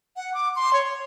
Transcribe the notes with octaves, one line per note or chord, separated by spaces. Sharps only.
F#5
D6
C6
C#5